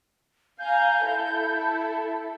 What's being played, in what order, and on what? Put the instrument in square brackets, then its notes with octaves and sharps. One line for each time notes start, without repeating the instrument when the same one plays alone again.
[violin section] F5 G#5 A#5 [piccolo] G6
[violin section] E4 A4